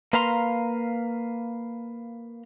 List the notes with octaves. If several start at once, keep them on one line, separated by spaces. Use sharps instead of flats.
A#3 B4 F5 A#5 C6